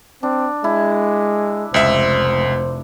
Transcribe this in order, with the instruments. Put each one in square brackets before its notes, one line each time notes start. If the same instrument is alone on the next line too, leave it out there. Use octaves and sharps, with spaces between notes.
[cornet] C4 [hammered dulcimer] D4
[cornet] G#3 [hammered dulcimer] E4
[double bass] F1 [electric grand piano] C#2 E5 [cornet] C5